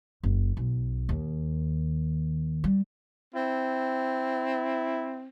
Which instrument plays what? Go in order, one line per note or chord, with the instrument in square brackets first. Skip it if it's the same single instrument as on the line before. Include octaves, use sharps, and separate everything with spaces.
[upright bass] F#1
B1
D#2
G3
[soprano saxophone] C4 [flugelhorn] E4